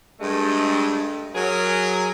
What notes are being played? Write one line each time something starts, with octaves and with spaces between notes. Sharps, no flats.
G2 G#3 A3
F#3 G#4 A#4